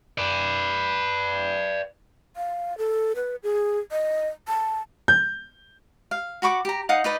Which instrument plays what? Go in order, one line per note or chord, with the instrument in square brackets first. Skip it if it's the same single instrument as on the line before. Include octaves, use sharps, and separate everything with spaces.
[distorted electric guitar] B4 D5
[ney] F5
A4
B4
G#4
D#5
A5
[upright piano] G6
[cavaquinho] F5
F#4 B5 C#6 D6
G4 A#5
D#4 F5 F#5 D#6
D#4 B4 D5 D#5